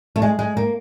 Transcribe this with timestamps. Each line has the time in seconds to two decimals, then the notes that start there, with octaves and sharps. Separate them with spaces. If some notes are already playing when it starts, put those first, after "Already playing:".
0.16 A3
0.22 G#3
0.39 G#3
0.57 A#3